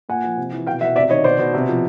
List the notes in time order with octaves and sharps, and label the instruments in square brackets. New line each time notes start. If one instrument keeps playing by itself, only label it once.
[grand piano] A#2 F#5 G#5
F3
C3
E3
B2 F5 G5
B2 E5 F#5
C3 D5 E5
D#3 C#5 D#5
B2 C5 D5
B2
C3
F3